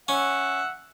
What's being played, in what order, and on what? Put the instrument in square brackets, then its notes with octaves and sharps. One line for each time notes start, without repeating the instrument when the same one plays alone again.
[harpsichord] C#4 [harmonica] E5 F#5